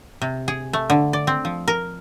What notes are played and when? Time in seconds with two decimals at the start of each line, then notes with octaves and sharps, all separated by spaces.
0.22 C3
0.48 G#4
0.73 A3
0.90 D3
1.13 D5
1.27 C4
1.45 F3
1.68 A#4